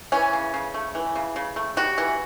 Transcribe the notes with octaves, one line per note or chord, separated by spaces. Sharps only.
E3 C#4
C#3
C#3
A3
E3
C#3
C#3
A3
G3 F#4
E3